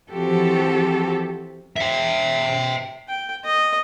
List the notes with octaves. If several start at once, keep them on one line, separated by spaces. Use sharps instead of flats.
E3 F3 C4 F#4 G4 A4
E5 G5
G5
D#5